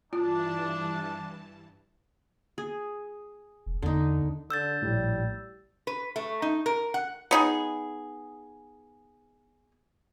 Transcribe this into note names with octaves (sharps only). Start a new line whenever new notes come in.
G2 E3 D4 F4 A5
G#4
F1
E2 D3 D#4
D3 E6 G6 A6
A#1 A2 G3
B4
A3
D#4
A#4
F#5
B3 D#4 G#4